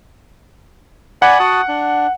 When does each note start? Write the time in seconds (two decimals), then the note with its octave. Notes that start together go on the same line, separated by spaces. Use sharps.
1.22 D5 F#5 G#5 B5
1.40 F#4 A5 D#6
1.68 D4